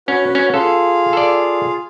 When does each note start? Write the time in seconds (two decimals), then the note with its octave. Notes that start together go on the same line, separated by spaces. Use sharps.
0.08 C#4 F#4 B4
0.35 C#4
0.54 F4 G#4 A4 F5
1.13 A4 D5